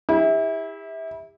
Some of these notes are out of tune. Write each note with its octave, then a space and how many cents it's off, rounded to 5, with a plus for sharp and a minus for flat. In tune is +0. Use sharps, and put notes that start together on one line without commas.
E4 -20 G4 +40